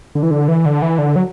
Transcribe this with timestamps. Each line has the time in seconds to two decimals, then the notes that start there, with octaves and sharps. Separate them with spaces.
0.15 D3
0.23 E3
0.31 D3
0.48 E3
0.66 D3
0.82 E3
0.98 D3
1.16 F#3